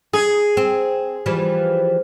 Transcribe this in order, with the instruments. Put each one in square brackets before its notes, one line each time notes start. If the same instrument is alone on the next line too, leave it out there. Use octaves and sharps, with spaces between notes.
[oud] D#4 [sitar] G#4
[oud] C4
E3 F3 G3